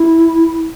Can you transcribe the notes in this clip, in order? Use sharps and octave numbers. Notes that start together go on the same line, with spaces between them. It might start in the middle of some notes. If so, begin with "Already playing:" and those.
Already playing: E4